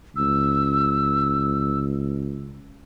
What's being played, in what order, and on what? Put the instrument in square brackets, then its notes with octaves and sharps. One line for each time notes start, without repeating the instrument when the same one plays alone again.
[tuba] C#2 [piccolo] E6